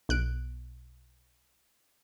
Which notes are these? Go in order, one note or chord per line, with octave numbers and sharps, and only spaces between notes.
B1 F#6 D7